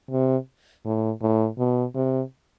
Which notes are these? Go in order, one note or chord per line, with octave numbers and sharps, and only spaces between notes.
C3
A2
A2
B2
C3